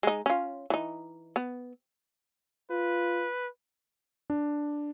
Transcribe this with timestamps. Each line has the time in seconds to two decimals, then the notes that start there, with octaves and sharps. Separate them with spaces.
0.03 G#3 D#4
0.26 C#4 F4
0.70 E3 D#4
1.36 B3
2.70 F4 B4
4.30 D4